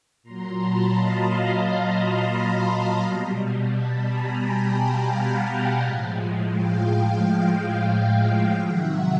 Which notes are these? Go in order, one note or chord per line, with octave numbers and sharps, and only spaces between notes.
A#2 F#3 A#5 C6
A5 B5
D#5 F5
A5 B5
A#5 C6
A5 B5
A#5 C6
B2 G3
A5 B5
G#5 A#5
G5 A5
F5 G5
F#5 G#5
F#5 G#5
A2 F3 G#3
F5 G5
F5 G5
C3 D#3 F#3 E5 F#5